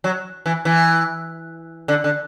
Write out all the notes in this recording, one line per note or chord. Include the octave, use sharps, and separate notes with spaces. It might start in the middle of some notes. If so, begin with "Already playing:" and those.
F#3
E3
E3
D3
D3